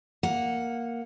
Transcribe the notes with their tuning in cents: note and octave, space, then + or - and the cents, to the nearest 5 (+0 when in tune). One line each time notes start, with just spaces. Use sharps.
A#3 +0 F#5 -5